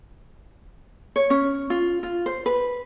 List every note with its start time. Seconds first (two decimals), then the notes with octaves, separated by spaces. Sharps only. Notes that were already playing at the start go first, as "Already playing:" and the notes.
1.16 C#5
1.30 C#4
1.70 F4
2.03 F4
2.26 C5
2.46 B4